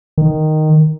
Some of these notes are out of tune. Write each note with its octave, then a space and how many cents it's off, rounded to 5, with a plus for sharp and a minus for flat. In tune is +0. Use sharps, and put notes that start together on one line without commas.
D#3 -5